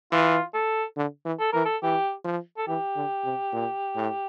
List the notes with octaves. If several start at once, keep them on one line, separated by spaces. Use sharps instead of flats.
E3 F4
A4
D3
E3
A4
E3 A#4
A4
E3 G4
F3
A4
E3 G4
D3
C3
A#2
A2